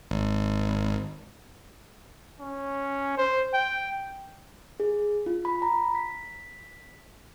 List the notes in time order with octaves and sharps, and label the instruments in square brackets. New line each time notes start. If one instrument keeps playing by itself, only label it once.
[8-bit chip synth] G#1
[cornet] C#4
C5
G5
[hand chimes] G#4
F4
B5
A#5
B6